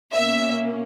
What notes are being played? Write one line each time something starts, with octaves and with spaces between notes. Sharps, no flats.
B2 A#3 C#4 E5